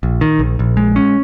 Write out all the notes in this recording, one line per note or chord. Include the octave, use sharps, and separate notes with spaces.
A#1
D#3
A#1
A#1
G#3
C#4